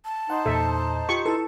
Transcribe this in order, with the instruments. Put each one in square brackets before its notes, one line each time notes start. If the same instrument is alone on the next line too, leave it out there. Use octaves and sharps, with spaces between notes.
[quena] A5
[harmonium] D#4 C5 [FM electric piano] F#5
[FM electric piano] E2 A#2 [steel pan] A4 E5
[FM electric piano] F4 G4 [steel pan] C#6
[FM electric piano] E4 B4 [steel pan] A4